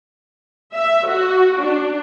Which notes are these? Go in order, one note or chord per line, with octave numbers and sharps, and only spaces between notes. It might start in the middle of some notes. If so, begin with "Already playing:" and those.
E5
F#4
D4